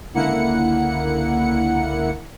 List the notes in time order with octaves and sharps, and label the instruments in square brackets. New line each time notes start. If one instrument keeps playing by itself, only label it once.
[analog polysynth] C#2 D3 A#3 E4 F#5 C#7